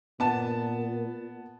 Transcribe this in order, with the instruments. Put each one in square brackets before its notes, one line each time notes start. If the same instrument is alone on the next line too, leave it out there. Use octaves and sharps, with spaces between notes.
[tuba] A#2 [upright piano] B3 A5